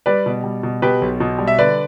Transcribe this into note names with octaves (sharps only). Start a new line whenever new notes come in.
G3 B4 D5
B2
G3
B2
B2 G4 B4
B1
B2
G3
E5
D3 B4 D5